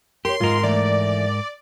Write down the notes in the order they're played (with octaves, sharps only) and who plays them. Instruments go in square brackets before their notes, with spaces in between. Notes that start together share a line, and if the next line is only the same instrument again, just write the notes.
[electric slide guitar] G4 [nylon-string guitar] A#4 C#5 [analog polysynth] C6
[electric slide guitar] G#2 A#4 [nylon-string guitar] F4 D#5
[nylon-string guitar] E3 A3 [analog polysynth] D5